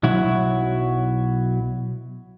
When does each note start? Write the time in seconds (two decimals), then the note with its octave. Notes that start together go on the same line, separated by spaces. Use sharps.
0.03 B1 F#3 E4 F#4